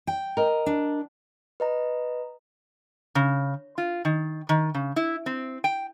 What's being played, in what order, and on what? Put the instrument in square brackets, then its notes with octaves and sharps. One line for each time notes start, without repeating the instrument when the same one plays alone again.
[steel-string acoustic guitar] G5
[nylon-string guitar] A#4 D#5
[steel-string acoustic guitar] D4
[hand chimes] B4 D#5 A#5
[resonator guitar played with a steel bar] C#3
F4
D#3
D#3
C#3
E4
C4
G5